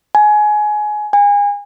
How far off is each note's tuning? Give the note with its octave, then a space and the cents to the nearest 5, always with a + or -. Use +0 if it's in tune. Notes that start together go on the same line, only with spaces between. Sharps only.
G#5 +20
G#5 -30